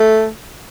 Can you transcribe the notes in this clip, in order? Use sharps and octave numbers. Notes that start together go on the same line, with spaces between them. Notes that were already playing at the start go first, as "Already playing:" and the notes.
Already playing: A3